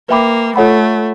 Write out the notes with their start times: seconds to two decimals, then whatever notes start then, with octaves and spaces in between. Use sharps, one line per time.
0.09 A#3 B4 E5 G5 B5 D6
0.56 A3 F4 A4 C#5 F#5 B5